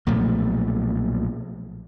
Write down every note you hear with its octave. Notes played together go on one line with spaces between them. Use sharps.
B1 A#2 F3 A3